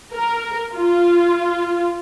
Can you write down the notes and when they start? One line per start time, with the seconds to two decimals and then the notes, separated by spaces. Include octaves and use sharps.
0.13 A#4
0.75 F4